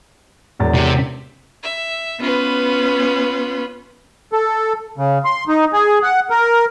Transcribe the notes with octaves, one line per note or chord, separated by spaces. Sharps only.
E1 E2 A6
C3
E5
B3 C#4 F4 B4
A4
C#3
C6
D#4
G#4
F#5
A#4